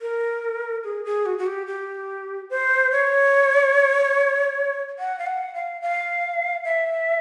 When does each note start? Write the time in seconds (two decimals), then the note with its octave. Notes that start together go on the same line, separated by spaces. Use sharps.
0.01 A#4
0.84 G#4
1.05 G#4
1.26 F#4
1.38 F#4
1.47 G4
1.67 G4
2.50 C5
2.92 C#5
4.99 F#5
5.19 F5
5.27 F#5
5.54 F5
5.82 F5
6.65 E5